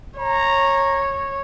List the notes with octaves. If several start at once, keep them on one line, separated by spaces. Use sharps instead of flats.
C#5 A#5